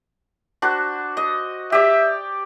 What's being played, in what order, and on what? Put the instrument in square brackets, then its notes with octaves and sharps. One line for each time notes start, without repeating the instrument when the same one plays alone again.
[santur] D4 F#4 C5
D#5
[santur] G4 D5 [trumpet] E5